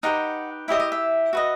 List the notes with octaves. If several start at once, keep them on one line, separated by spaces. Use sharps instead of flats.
D#4 G4 B4 F#5
E4 G4 D#5 E5
D#5
E5
F#4 B4 D#5